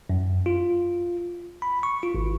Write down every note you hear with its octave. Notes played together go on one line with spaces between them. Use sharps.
F#2
F4
B5
C#6
F4
G#1